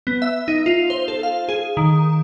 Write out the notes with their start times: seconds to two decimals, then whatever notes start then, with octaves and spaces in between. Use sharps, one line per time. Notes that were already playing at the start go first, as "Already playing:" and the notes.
0.07 B3
0.22 E5
0.48 D#4
0.66 F4
0.90 C5
1.08 A4
1.23 F5
1.49 G#4
1.77 D#3